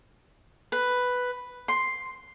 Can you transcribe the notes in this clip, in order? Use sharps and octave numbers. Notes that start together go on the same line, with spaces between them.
B4
C6